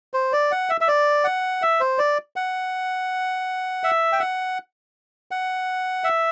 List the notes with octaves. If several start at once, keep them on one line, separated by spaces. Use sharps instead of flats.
C5
D5
F#5
E5
E5
D5
F#5
E5
C5
D5
F#5
E5
G5
F#5
F#5
E5